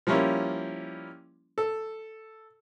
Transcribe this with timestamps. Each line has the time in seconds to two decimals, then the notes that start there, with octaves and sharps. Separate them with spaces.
0.07 F3 G3 A#3 C#4 E4
1.58 A4